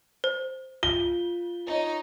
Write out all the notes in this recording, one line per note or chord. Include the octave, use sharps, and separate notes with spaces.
C5
F4 G7
D#4 C#5